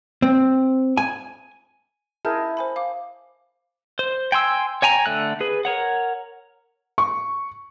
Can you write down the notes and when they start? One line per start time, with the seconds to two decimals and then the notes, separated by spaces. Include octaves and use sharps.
0.22 C4
0.97 G#5
2.25 E4 G#4 A#4 A5 F6 G6
2.57 C5 G#5 B5
2.76 F5 D6
3.99 C5
4.32 G5 G#5 C6 E6
4.82 C#5 G5 G#5 A#5
5.06 D3 A3 F#6
5.41 G#4 B4
5.65 A#4 C#5 F#5
6.98 C#6